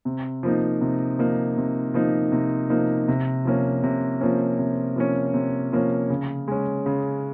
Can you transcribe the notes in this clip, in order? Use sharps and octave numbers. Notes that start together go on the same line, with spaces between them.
C3
F3 A#3 D#4
C3
F3 A#3 D#4
C3
F3 A#3 D#4
C3
F3 A#3 D#4
C3
F3 A#3 C#4
C3
F3 A#3 C#4
C3
F3 A#3 C#4
C3
F3 A#3 C#4
C#3
G#3 C#4
C#3